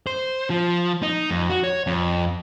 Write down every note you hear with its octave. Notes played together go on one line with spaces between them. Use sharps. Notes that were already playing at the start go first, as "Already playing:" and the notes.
C5
F3
D#4
F2
F#4
C#5
F2